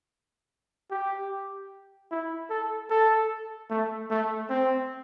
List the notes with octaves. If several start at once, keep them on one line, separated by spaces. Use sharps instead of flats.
G4
E4
A4
A4
A3
A3
C4